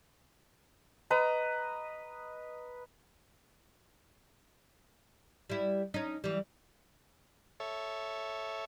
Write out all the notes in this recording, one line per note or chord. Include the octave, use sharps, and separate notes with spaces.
B4 D#5 A#5
G3 E4
C#4 D#4
E3 G3
A4 C#5 E5